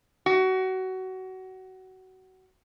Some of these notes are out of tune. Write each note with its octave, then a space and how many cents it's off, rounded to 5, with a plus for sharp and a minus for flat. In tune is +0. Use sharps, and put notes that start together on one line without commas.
F#4 +25